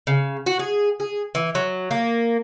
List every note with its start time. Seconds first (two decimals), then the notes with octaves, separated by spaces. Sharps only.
0.07 C#3
0.46 F#4
0.59 G#4
1.00 G#4
1.35 E3
1.55 F#3
1.91 A#3